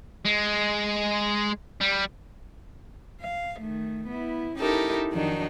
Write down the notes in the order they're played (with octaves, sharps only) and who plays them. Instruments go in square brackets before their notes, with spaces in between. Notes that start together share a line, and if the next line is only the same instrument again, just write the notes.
[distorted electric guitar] G#3
G3
[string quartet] F5
D#3 A3
B3 E4
C#4 D#4 E4 G4 A4 A#4
F2 D#3 F#3 D4 D#4